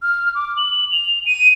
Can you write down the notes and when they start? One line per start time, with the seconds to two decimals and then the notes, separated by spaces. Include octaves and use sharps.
0.02 F6
0.35 D6
0.57 F#7
0.92 F7
1.26 D#7